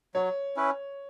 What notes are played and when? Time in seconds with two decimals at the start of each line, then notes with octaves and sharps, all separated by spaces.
0.15 F#3 C#5
0.56 C#4 E4 B4